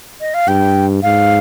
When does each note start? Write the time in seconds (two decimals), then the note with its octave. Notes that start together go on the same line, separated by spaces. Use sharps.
0.21 D#5
0.34 F5
0.48 G2 G5
1.03 G#2 F5